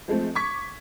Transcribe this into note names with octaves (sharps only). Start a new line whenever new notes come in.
F3 G#3 A3 C4
C#6 D6 G#6 B6